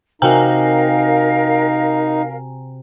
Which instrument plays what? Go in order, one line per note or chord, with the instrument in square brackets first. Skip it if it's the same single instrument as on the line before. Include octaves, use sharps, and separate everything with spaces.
[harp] C3 F#4 [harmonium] D#4 [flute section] A#4 F5 [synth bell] G5 G#5 A#5